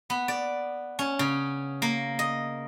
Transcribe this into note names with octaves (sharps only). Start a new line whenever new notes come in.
B3
D5
C#4
C#3
A#3
D#5